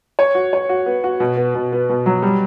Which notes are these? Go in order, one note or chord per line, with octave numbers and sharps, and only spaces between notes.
C#5
F#4
C#5
F#4
B3
F#4
B2
B3
B2
B3
B2
F#3
G3